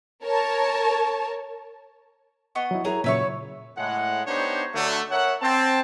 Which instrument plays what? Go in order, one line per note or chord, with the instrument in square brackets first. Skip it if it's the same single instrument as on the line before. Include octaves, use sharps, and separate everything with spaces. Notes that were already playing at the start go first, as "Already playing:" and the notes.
[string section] A#4 C#5 A5
[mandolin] B3 D#5 C#6
[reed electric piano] F#3 E4
[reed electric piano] E4 A#4 C#5 [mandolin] G#4 [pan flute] A#5
[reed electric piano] A#2 C#3 F#3 [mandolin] B4 E5 C#6 [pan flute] C#5
[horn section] A2 G#3 F#5
B3 D4 D#4 G4 C5 C#5
D3 F#3 A3
A#4 C#5 E5 F#5
C4 A5